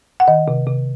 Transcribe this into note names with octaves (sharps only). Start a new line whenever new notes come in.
F#5
D#3 D#5
C3
C3